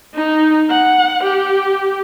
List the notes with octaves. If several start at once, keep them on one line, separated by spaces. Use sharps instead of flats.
D#4
F#5
G4